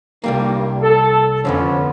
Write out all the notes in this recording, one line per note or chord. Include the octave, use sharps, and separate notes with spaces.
C2 G2 D#3 G3 A#3
A4
F2 D3 F3 B3 C#4